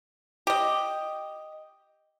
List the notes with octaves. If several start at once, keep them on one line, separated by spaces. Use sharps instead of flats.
G4 D#5